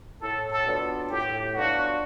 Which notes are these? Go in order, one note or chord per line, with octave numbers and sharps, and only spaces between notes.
A2 A4
A4
F#3 B3 D4 F4
A2 G4
F#3 B3 D4 F4 F#4